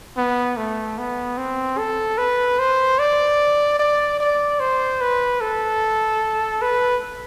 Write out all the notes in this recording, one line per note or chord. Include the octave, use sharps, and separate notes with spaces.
B3
A3
B3
C4
A4
B4
C5
D5
D5
D5
C5
B4
A4
B4